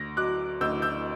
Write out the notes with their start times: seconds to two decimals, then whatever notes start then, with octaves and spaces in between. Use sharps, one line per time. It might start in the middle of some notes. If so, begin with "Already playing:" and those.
Already playing: D2 A#6
0.17 F#3 D6 F#6
0.61 D2 E6 G6
0.82 E6 G6